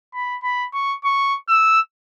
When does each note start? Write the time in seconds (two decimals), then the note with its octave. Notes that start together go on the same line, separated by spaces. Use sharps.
0.14 B5
0.43 B5
0.74 C#6
1.04 C#6
1.48 E6